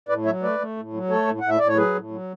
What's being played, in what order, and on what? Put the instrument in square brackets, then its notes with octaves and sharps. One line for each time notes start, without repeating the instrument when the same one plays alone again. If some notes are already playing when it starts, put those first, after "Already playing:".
[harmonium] A2 B4 D5
F#3 C#5 E5
A3 B4 D5
A3
A2
F#3
A3 A4 C#5
A2
A2 F#5
E5
A2 D5
C#5
F#3 G#4 B4
A2
F#3